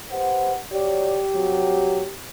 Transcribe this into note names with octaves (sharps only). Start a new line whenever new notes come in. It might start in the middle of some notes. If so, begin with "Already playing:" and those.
G4 B4 C5 F#5
F#3 G4 C#5 D5
G2 C3 F#3